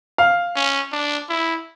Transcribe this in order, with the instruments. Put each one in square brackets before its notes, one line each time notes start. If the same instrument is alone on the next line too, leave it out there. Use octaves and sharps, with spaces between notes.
[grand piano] F5
[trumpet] C#4
D4
E4